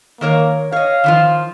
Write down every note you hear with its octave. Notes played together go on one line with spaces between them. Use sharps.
D#3 A#3 A#4 C#5
C#5 D#5 F5
D#3 F3 F4